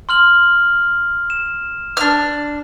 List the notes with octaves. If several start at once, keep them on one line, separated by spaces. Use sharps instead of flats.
C6 F6 F#7
E7
D4 F6